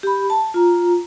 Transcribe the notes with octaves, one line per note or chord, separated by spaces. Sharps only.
G4 B5
A5
F4 A#5